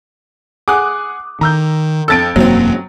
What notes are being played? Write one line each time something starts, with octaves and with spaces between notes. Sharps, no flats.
G#4 F#5 G#5 D6 D#6 F#6
D#3 A#5 E6 G6
F2 A4 E6 A6 D7
E1 F#2 F#3 A#3 C4